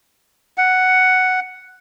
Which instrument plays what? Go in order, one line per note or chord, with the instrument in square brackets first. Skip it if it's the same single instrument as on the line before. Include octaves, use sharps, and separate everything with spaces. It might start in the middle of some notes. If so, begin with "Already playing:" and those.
[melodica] F#5